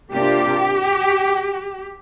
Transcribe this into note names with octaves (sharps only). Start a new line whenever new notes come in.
C3 A#3 D4 F4 G4